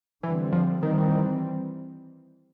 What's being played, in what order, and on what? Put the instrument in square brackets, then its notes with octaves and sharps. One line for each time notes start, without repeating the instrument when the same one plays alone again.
[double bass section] D3 G3 C4 [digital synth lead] E3
[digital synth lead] F3
[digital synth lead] D#3 [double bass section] E3 G3 C4